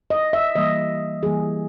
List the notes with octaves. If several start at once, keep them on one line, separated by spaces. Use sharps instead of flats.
D#5
E5
E3 G3 A#3 D#5
E3 G3 A#3 G#4